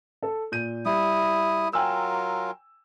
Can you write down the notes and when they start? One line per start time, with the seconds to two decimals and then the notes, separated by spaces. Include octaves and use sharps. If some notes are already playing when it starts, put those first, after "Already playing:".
0.22 A4
0.52 A#2 G6 D#7
0.85 G3 E4 D#6
1.73 F#3 F4 A#4 G5 G#5 E6